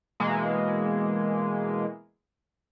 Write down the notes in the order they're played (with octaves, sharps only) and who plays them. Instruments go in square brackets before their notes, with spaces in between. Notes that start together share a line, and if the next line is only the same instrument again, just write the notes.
[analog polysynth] B2 E3 G#3 A#3